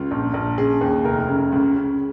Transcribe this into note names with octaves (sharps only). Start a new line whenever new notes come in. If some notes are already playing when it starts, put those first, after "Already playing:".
Already playing: C#2 F4
A#1
A#1
C#3 G#4
D#2
F1 A#4
C#3
C#2
C#3